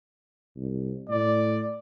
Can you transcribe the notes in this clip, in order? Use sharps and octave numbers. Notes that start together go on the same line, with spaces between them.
C2
A2 D5